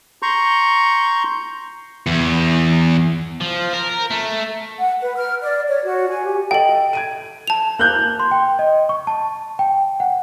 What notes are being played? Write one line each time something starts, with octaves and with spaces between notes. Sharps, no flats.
A#5 C6 C#6 G6
E2
F3
A#4
A3
F#5
B4
F6
D5
C#5
F#4
G#5
G4
A4 D#5 G5 F#7
G#6 D7 D#7
A5 F7
A#3 F#6 G6
C6
G5
D#5
C#6
A5
G5
F#5